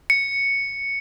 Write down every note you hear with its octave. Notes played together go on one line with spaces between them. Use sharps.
C#7